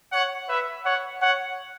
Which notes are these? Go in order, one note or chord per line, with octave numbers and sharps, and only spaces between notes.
C#5 F#5
B4 E5
C#5 F#5
C#5 F#5